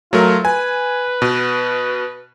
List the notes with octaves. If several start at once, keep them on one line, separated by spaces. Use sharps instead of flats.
F#3 A3 F4 A#4
B4 G#5
B2